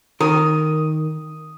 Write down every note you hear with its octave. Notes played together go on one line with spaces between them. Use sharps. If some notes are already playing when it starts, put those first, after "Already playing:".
D#3 A#4 D#6